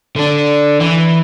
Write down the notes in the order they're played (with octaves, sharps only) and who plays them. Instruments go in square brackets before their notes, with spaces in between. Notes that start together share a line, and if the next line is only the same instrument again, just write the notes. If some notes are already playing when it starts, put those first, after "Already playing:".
[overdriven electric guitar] D3 D4
E3